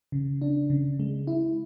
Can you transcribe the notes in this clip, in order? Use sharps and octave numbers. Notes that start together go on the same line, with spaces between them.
C#3
D4
C#3
G#3
E4